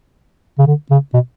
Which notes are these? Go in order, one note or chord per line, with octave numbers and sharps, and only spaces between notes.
C#3
D3
C#3
B2